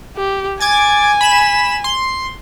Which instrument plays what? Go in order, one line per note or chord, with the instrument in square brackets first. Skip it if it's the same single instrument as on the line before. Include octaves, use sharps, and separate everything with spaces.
[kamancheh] G4
[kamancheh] G#5 [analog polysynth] D6 G#6 A6
[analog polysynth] B5 E7
C6